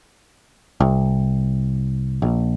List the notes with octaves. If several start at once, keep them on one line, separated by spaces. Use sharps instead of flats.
C2
A#1